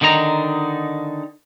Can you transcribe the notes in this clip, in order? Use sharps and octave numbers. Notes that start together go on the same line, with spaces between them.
D3 D#3 D#4 D5 A#5